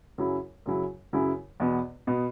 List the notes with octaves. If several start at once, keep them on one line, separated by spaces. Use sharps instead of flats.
F#2 C#3 F#3 E4
F#2 C#3 F#3 E4
F#2 C#3 F#3 E4
E2 B2 B3
B2 B3